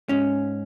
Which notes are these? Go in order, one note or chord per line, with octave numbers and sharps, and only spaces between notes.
G#2 C#4